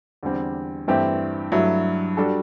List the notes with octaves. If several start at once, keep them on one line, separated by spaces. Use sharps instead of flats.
E2 D3 G3 C4
G2 E3 A3 C4 G4
G2 F#3 A3 E4
G3 D4 F#4 A4